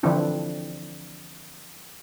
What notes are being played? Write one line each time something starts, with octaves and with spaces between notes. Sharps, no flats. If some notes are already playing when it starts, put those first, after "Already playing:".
D3 E3 F3 C4 D4 E4